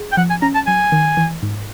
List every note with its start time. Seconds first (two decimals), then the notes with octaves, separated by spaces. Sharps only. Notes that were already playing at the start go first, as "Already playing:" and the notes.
Already playing: G#4
0.12 G5
0.17 F3 F#5
0.30 G#5
0.42 C#4 A#5
0.55 A5
0.67 F#3 G#5
0.92 D#3
1.17 E3
1.43 G#2